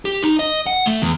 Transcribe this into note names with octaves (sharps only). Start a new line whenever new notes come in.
G4
D#4
D#5
F#5
A3
E2